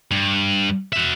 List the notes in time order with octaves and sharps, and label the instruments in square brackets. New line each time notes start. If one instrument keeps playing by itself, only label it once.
[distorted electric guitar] G2
F#4 E5